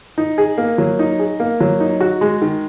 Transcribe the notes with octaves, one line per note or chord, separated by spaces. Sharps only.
D#4
G#4
A#3
F#3
D#4
G#4
A#3
F#3
D#4
F#4
G#3
D#3